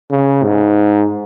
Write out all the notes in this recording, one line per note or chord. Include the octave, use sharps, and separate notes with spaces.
C#3
G#2